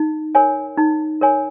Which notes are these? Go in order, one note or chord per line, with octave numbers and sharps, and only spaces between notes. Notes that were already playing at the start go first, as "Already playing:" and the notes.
Already playing: D#4
A#4 C#5 G#5
D#4
A#4 C#5 G#5